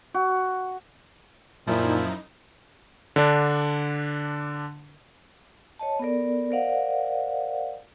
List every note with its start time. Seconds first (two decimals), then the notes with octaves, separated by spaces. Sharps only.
0.14 F#4
1.67 F#2 A#2 F3 D#4 E4
3.16 D3 D4
5.79 C#5 D#5 A5
5.99 B3 A4 A#4 D5
6.51 A#4 C5 D5 D#5 F5 F#5